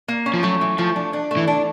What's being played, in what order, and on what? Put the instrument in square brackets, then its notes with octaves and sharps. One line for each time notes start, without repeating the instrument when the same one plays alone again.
[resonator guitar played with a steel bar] A#3
C#4
[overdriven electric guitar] F3
[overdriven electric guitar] F#3 [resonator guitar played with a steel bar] A3
[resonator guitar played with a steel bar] E3
[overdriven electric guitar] F3 [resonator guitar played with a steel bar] A3
[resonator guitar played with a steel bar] D4
D4
A3
[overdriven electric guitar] E3
[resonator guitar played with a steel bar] D4